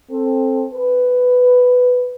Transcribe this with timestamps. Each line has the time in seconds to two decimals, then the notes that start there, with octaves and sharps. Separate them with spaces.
0.10 C4 A4
0.73 B4